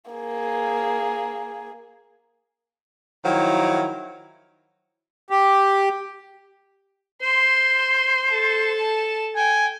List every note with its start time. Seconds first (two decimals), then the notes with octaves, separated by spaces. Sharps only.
0.11 A#3 G#4
3.25 D#3 F3 F#3 E4
5.30 G4
7.23 C5 C6
8.31 A4 A5
9.36 G5 G#5